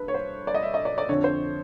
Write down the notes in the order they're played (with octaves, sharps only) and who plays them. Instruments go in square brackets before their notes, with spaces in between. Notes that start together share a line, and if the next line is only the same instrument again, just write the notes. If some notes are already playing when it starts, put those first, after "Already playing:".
Already playing: [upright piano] G2 B4
C#5
C5
D5
D#5
E5
D#5
D5
D5
F2 D3 C#5
C5